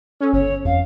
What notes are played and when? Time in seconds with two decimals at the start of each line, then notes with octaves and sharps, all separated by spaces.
0.21 C#4 A4
0.33 G1 C#5
0.65 F2 F5